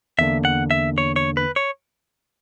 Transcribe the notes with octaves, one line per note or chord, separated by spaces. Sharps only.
E2 D3 A#3 D4 E5
F#5
E5
C#5
C#5
B4
C#5